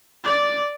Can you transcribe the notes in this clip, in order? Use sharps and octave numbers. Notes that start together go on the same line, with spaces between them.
D5